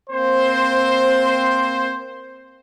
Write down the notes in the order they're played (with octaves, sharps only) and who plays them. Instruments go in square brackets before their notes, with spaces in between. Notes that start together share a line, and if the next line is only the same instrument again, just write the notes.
[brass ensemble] A#3 C4 C5